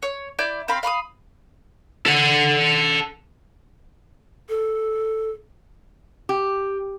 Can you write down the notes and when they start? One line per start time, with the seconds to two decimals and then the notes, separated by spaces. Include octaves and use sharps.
0.03 C#5
0.39 E4 D5 G6
0.68 C4 F5 B5 C6
0.83 F5 B5 C#6 D#6
2.06 A4 F#5
4.49 A4
6.29 G4